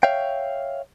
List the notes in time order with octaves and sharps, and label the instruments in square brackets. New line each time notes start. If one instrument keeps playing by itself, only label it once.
[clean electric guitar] C#5 E5 F5 G5